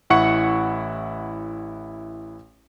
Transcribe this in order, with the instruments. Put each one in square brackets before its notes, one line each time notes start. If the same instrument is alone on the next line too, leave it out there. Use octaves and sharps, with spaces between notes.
[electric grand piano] A1 E4 F#5 C#6 C#7